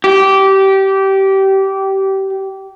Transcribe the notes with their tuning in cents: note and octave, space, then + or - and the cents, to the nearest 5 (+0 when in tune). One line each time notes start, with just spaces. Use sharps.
G4 -20